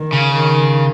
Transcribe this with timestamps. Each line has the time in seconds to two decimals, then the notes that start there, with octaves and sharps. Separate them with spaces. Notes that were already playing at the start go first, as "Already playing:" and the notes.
Already playing: D#3
0.13 C#3
0.34 D#3